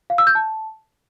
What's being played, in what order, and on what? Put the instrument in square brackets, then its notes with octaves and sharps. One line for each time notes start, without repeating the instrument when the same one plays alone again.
[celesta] F5
E6
G6
A5